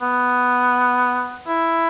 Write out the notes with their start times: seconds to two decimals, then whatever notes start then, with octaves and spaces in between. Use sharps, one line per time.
0.02 B3
1.48 E4